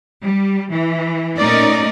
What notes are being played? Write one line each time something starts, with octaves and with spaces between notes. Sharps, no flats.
G3
E3
A#2 A3 C#4 D#4 A#4 D5